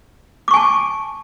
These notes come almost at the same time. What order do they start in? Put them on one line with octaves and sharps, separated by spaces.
D6 C#6 G#5 A5